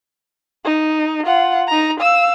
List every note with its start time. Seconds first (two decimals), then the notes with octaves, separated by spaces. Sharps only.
0.64 D#4
1.25 F4 F#5
1.68 D#4 A#5
2.00 F5 E6